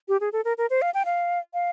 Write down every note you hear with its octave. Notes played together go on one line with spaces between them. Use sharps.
G4
G#4
A4
A#4
A#4
C5
F5
G5
F5
F5